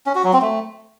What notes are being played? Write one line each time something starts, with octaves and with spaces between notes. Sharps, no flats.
C#4
F#4
F#3
C4
A3